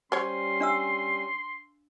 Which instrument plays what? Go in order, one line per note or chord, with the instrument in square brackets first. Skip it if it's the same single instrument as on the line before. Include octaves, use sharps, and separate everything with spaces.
[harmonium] G3 C#4 [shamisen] C5 C#5 [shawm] C6
[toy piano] D4 F5 E6